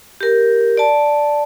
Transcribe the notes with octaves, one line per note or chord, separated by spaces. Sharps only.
G4 A#4
D5 A5